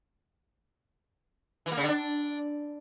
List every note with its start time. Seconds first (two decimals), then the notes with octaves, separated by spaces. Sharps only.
1.66 E3
1.72 A#3
1.77 C#3
1.83 D3
1.89 D4